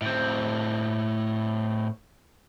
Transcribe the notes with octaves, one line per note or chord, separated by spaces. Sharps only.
A2 C4